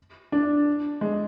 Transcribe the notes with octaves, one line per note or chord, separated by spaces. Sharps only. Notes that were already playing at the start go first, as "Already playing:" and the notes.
D4
G#3